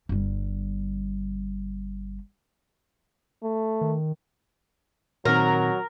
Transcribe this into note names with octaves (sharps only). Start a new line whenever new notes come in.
G1 G3
A3
D#3
A#2 D#3 F#3 C4 A#4